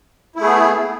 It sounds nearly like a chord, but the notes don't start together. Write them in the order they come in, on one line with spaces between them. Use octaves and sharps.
E4 A3 G#4 B3